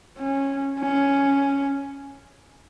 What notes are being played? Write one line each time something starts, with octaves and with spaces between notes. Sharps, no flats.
C#4
C#4